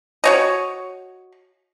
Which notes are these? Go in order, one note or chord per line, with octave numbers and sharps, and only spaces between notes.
F#4 C#5 D#5